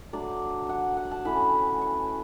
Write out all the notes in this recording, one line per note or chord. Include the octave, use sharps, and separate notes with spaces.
F#3 A3 D4 D5
F#5
F#5
A5
A2 E3 A3 C#4 B5
C#6